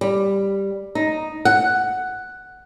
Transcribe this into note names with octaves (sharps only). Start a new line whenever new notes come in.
G3
D#4
F#5